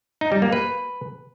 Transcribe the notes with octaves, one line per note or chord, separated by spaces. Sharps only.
D#4
G3
A#3
B4